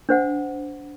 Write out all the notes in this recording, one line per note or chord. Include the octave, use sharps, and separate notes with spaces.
D4 C5 F#5